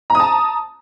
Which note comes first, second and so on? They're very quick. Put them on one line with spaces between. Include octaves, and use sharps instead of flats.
A#5 D#6 A5